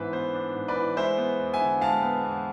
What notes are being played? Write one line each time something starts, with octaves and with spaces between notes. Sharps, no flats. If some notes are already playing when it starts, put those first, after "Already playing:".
Already playing: G#2 E3 B3 D4 B4 C5 E5
B3 C5
D4
G#2
B4 D5
E3
G#3 C5 E5
B3
E2
E5 G#5
D3
G#3 F5 A5
B3
E2